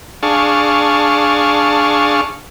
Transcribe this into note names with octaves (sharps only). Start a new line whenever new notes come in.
D4 G#4 F5 A5 C#6